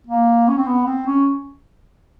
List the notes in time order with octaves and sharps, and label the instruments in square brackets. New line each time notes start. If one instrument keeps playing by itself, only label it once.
[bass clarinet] A#3
C#4
C4
B3
C4
C#4